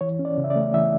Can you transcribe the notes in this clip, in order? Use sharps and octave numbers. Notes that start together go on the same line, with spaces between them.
E3 C#5
C#4
D5
C#3
E5
D5
A3
E3 E5